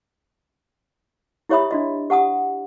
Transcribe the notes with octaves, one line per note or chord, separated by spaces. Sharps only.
E4 G4 C#5 E5 B5 D#6
D4 F#4 D#5
G4 F#5 A5 D#6